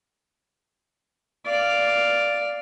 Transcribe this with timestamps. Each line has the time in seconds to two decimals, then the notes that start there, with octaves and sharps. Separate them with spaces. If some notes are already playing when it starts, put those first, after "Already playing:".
1.46 D5 F5